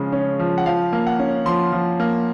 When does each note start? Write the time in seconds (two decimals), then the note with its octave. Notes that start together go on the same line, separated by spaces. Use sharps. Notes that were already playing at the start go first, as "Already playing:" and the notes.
Already playing: C#3 F3 G#3
0.13 C#4
0.39 F3
0.58 F#5
0.66 F3 F5
0.93 A#3
1.07 F#5
1.19 C#4
1.46 F3 C6
1.72 F3
2.00 A#3